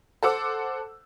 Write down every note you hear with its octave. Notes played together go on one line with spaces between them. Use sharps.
A4 C5 F#5 D6 E6